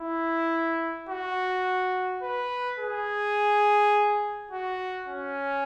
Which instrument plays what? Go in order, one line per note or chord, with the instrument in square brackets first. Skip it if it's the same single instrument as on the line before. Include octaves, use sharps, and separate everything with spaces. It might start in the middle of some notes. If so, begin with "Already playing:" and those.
Already playing: [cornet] E4
F#4
B4
G#4
F#4
C#4